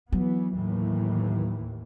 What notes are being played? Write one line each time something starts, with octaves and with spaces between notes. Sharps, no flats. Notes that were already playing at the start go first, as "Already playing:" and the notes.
E3 F#3 B3
D#2 A2 E3